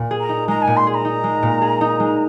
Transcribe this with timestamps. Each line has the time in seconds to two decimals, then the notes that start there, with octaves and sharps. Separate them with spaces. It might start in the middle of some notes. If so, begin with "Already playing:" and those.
Already playing: A#2
0.11 G#4
0.21 A#5
0.29 D#4
0.48 G#3 A#5
0.62 G#5
0.67 A#2
0.77 C6
0.87 G#4 C6
0.95 A#5
1.05 D#4
1.24 G#3
1.43 A#2
1.62 G#4
1.81 D#4
2.00 G#3